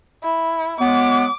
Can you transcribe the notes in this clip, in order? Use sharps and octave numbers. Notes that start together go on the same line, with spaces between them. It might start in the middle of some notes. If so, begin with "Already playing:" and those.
E4
F#3 G#3 B3 D6